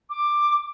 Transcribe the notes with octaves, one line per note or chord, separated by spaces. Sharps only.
D6